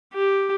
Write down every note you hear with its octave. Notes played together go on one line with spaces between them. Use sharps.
G4